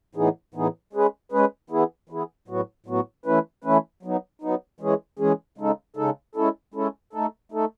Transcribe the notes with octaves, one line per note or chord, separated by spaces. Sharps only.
A2 E3 B3 D#4 G#4
A2 E3 B3 D#4 G#4
G#3 C#4 G#4 B4
G#3 C#4 G#4 B4
E3 B3 E4 G#4
E3 B3 E4 G#4
A2 F#3 B3 F#4
A2 F#3 B3 F#4
E3 A3 C#4 E4 B4
E3 A3 C#4 E4 B4
F#3 B3 D#4
F#3 B3 D#4
E3 G#3 C#4 G#4
E3 G#3 C#4 G#4
C#3 G#3 D#4 A4
C#3 G#3 D#4 A4
G#3 C#4 E4 A4
G#3 C#4 E4 A4
A3 D#4 A4
A3 D#4 A4